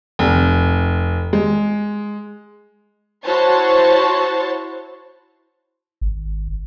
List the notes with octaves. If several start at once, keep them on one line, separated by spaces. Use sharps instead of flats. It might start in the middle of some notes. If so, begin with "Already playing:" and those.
F1
G#3
E4 F#4 C5 C#5 A5
G#1